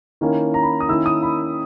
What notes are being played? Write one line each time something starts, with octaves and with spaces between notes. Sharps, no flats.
D#3 A#3 C#4 E4
A#5
B5
D#6
D#3 A#3 C#4 E4 E6
D#6
B5